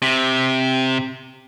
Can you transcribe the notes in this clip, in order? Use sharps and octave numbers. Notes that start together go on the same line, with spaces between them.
C3